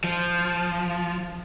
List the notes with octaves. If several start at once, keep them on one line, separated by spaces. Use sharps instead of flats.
F3